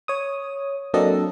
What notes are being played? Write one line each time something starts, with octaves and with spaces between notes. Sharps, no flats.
C#5 D#6
F#3 A#3 C4 D4 A4 D#5